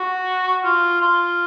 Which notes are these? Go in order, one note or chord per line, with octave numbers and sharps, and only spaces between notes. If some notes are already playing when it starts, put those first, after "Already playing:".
Already playing: F#4
F4
F4